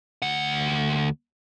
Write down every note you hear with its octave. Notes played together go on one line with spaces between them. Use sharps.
D2 F#5